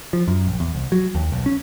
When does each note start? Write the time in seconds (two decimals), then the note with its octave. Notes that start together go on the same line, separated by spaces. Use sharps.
0.13 F3
0.28 F#2
0.47 A#1
0.60 E2
0.75 C2
0.92 F#3
1.15 D#2
1.32 B1
1.46 C#4